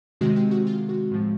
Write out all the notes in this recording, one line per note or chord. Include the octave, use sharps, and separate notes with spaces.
C3 D#3 G#3 C4 F#4
G4
F#4
F4
F#4
A2 F3 G#3